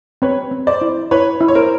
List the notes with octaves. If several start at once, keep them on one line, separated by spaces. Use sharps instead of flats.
C4 B4 C#5
C4
C5 D5
E4
E4 B4 C#5
E4
C#5
A#4 C5